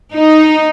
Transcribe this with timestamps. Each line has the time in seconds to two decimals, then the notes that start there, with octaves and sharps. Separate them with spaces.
0.13 D#4